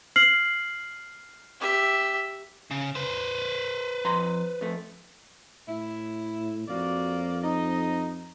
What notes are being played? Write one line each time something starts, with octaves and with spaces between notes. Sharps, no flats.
F6 C7 F#7
G4 E5
C#3
B4 C5
F2 A#5 C6
F2 A3
A2 E4
F2 A#3 F#4 D5
D#4 D#5